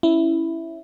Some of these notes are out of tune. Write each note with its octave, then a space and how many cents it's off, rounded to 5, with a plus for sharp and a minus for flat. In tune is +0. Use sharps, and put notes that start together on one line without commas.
C#4 +0 E4 +0